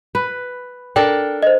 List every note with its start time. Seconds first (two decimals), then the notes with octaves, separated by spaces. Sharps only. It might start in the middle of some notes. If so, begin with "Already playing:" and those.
0.15 B4
0.96 D4 A4 A#4 G5
1.43 C5 D#5